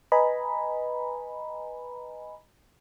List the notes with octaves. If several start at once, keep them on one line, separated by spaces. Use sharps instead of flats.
B4 D#5 G#5 A#5 B5